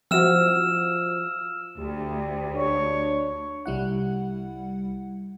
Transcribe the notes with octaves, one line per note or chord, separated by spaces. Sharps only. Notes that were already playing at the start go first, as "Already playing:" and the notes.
F3 C4 E4 F#4 E6 F6 E7
D2 G4
D4 C#5
C2 G3 E4 F#5